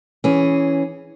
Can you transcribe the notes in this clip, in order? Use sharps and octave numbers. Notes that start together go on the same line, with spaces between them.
E3 C#4 G#4